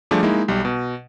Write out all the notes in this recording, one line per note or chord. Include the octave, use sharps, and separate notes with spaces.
F3 G3 A3 D4 G4 G#4
G#3 A#3 D#4 E4
B1 G3
B2